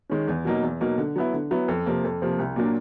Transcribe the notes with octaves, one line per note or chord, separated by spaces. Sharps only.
D#3 G#3 C#4
E2
B2 F#3 A#3 D#4
E2
B2 F#3 A#3 D#4
D3
F#3 B3 E4
D3
F#3 B3 E4
F2
C3 F3 A#3
F2
C3 F3 A#3
C2
A#2 F#3 A#3 D4